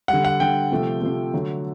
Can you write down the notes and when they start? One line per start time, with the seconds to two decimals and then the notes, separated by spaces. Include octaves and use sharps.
0.08 G3 F#5
0.13 D3
0.25 F#5
0.39 D3 G3 G5
0.72 C3 F3 A3
1.02 C3 F3 A3
1.33 D3 F#3 A3